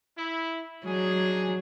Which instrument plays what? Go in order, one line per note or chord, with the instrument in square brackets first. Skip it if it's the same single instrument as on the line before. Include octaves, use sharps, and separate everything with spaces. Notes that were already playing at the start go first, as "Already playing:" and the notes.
[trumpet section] E4
[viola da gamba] F#3 [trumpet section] D4 D#4 G#4